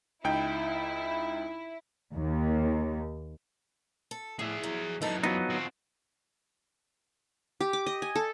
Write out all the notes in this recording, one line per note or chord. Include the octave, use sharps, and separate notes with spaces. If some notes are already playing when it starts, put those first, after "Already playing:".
C#2 D#4 E4 G5
D#2
A4
A2 G#4 E5
F#3
F#2 E3 D#4 A4
F3 F#3 B3 D#4
C4 F#4
G4
D6
D#5
G#5
A4